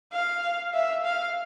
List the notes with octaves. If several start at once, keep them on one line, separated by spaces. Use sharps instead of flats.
F5
E5
F5